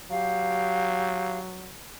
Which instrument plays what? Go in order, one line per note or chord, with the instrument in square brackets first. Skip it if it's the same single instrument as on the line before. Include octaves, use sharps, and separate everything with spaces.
[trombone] F#3 [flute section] G4 F5